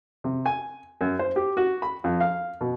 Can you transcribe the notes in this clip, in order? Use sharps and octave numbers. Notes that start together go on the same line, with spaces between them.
C3
G#5
F#2
C5
G4
F#4
B5
F2
F5
B2